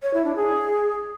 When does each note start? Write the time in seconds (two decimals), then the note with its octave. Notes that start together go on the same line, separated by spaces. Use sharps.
0.02 C#5
0.14 E4
0.25 D4
0.36 G#4